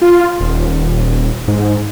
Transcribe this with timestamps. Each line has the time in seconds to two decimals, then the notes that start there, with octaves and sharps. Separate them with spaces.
0.02 F4
0.40 D#1
1.48 G#2